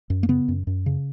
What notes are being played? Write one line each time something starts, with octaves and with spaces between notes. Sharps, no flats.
F#2
A#3
C#3 B3
F#2
F#2
C#3